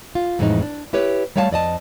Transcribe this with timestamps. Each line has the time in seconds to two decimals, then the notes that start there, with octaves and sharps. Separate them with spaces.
0.15 F4
0.39 F2 A2 E3 G#3 C#4 D#4
0.62 D4
0.93 E4 G4 B4 C#5
1.36 G3 A3 C#5 F5 G#5 A5
1.51 F2 D5 D#5 A5